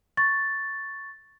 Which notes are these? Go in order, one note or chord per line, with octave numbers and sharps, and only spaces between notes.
C#6 A6